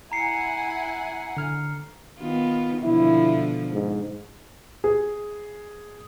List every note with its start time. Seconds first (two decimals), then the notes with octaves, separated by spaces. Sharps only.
0.12 E4 F#5 G#5 A#5 C7 C#7
1.37 D3 F6
2.20 D#3 B3 F4
2.83 B2 D3 F3 E4
3.72 G#2
4.84 G#4